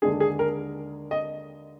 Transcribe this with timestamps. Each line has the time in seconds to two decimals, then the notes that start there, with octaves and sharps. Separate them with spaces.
0.02 D#2 D3 G#3 D4 G#4
0.20 G#4
0.39 A#4
1.11 D#5